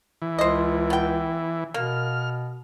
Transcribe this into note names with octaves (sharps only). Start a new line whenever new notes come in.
E3
C#2 C5 D#5
B3 G5
B2 A#3 F6